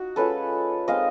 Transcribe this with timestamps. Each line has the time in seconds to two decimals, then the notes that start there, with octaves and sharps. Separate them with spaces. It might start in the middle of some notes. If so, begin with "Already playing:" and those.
Already playing: D#4 F#4
0.16 G#3 C#4 F4 A4 B4
0.88 G#3 C4 D#4 D#5 F5